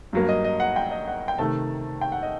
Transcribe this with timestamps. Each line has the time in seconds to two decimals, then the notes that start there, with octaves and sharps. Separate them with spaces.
0.13 G2 F#3 A#3
0.29 D#5
0.44 D#5
0.60 F#5
0.76 G5
0.91 D#5
1.08 F#5
1.28 G5
1.38 C3 D#3 A3 A5
2.01 G5
2.12 F#5
2.23 D#5